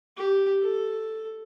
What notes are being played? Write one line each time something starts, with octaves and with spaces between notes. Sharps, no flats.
G4
A4